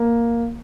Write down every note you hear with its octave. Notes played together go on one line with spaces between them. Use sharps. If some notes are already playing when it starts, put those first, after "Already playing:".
Already playing: A#3